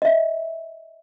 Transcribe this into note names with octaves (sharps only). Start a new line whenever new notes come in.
D#5 E5